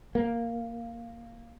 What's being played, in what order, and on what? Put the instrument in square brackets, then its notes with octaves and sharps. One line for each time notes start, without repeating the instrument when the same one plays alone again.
[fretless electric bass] A#3